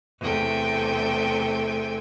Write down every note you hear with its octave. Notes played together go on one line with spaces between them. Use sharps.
E2 C3 A3 A4 G5 G#5